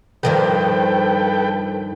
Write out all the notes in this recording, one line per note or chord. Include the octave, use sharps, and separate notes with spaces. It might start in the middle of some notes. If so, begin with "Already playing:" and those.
G2 D#3 F3 A4 B4 G5